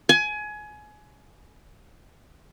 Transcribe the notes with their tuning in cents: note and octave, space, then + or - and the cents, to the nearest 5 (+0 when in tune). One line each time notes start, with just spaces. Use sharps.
G#5 +25